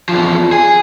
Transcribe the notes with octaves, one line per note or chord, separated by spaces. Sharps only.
E2 F3
G#4